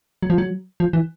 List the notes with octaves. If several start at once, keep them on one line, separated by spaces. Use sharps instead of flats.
F#3
F3
F#3
F3
E3